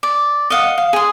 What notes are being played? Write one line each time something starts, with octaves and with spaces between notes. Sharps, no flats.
D5
D#5 F5 F#5
F5
G#4 C6